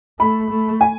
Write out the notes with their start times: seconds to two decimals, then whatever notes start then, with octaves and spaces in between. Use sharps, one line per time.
0.20 A3 B5
0.50 A3
0.81 G#5